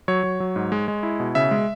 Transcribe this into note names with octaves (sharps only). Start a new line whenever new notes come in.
F#3 C#5
F#3
F#3
G#2
G#3
G#3
E4
B2
C#3 E5
G#3